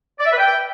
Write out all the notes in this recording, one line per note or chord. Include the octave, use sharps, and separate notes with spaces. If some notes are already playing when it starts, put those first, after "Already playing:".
D5
E5
B4
G5